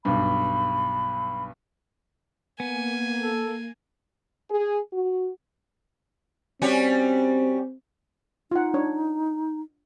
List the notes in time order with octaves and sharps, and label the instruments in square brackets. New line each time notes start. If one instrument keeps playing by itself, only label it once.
[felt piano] B1 G2 [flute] B5
[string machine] A#3 [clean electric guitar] B3 [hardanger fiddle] G#5
[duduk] A4
[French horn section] G#4
F#4
[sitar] G3 C#4 F#4 [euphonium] C4
[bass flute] D#4 [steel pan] F4 F#5
[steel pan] D4 C#5